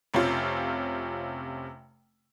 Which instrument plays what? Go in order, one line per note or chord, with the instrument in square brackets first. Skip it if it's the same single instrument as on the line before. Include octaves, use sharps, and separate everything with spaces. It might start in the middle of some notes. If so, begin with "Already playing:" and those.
[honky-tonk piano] F1 C3 C#4 F4